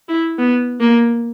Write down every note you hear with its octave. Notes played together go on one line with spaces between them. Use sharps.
E4
B3
A#3